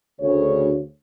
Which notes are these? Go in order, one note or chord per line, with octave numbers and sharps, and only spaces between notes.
D2 C#3 C#5